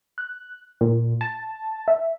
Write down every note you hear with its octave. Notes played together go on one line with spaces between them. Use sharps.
F#6
A#2
A5
E5